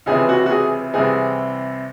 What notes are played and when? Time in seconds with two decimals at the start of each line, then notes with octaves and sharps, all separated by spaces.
0.06 C#2 C3 E3 G#4
0.29 F#4
0.46 F#4
0.51 G#4
0.93 C2 C3 E3 G#4